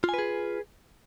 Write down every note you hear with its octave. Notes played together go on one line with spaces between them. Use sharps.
F4 G#4 B4 G#5